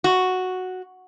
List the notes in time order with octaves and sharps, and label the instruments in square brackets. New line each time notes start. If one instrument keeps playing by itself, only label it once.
[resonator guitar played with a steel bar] F#4